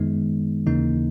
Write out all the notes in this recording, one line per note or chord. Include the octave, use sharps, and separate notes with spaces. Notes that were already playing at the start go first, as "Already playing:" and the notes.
Already playing: F#2 D#3 G#3 B3 D#4
D#2 C#3 E3 A#3 D#4